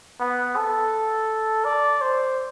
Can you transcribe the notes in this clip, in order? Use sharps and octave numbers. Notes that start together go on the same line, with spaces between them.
B3
A4
D5
C5